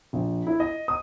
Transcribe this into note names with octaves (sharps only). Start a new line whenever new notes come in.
A#1
E4
D#5
D#6